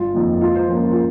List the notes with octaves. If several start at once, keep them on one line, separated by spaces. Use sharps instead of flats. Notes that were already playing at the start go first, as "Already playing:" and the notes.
Already playing: G1 F4
F2 D#3 A#3
G#2 F4
C5
F3 A#3 C#4 A#4
A#4
F4